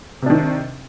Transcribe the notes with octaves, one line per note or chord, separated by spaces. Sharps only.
C3 D#3 D4